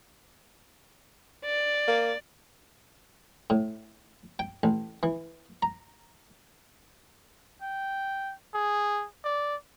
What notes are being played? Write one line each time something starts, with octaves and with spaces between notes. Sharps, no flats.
D5
A#3
A2
G5
A1
E3
A#5
G5
G#4
D5